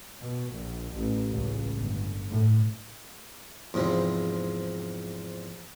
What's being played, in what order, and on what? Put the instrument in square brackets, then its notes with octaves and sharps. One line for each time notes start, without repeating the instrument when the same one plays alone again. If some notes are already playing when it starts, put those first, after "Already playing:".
[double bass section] B2
A#1
A1
C#2
G1
A2
[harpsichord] E2 G#2 C3 F3